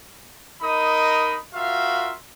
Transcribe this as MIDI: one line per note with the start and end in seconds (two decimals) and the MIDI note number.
0.62 1.36 63
0.62 1.36 70
0.62 1.36 75
0.62 1.36 83
0.62 1.36 87
1.53 2.13 65
1.53 2.13 66
1.53 2.13 70
1.53 2.13 76
1.53 2.13 77